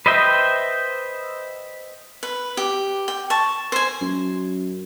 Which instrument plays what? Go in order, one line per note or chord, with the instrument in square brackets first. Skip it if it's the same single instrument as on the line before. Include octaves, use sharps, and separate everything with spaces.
[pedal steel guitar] B4 C5 D#5 E5 G5
[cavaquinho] B4
G4
G5
A5 C#6
C5 G#5
[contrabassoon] F#2